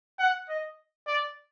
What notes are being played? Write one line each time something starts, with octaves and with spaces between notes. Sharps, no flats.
F#5
D#5
D5